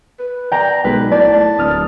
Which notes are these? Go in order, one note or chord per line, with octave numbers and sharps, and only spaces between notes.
B4
D5 G5 A#5
B1 G#3 B4
A2 D5 A5
D1 D#6 F6